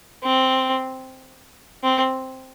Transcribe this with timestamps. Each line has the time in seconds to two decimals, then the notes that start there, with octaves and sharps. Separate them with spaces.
0.24 C4
1.83 C4